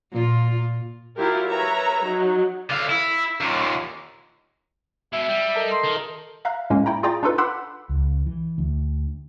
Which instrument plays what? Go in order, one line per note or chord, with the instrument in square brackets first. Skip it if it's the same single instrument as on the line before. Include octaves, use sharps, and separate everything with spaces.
[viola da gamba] A#2 F4
[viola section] F#3 E4 F4 G4 A#4
A#4 B4 C#5 E5 A#5
F#3 D#4
[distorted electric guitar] D3 F5
E4
D#2 A#2
[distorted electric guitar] B2 E4 [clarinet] E5
[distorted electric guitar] G3
[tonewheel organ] A4 A#4 D#5
[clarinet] C6
[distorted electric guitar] D#3
[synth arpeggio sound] E5 F5 A#5 F#6
A2 G#3 A#3 C#4
E4 G5 A#5
F4 G#4 D5 G5 A#5 A6
D4 D#4 F4 A4 B4
F#5 B5 C6 D6 E6 F#6
[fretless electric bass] C#2
E3
D2